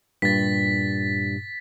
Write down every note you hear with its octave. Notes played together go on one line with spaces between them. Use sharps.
G2 A#2 A6 B6